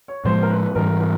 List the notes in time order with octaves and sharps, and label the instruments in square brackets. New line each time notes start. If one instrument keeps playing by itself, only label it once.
[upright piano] C#5
[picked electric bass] A2 F3 G#3 [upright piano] C5
[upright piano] A#4
B4
B4
[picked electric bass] G#2 E3 G3 [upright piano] A#4
[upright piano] A#4